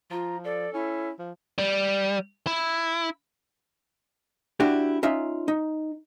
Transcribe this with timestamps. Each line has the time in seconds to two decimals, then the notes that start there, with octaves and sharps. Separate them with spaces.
0.11 F3 F4 A#5
0.44 A4 D5
0.73 C#4 E4
1.19 F3
1.59 G3
2.47 E4
4.60 D4 E4 F#4 G4
5.03 C#4 D#4 F4 E5
5.48 D#4